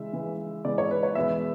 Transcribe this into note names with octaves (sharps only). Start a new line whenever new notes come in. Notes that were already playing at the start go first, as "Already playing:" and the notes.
Already playing: C#3 E3 G#3 E5
C#3 E3 G#3
C#3 E3 G#3 D5
C#5
B4
C#5
E2 B2 G#3 B3 E5